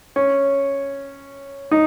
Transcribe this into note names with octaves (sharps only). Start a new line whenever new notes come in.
C#4
D#4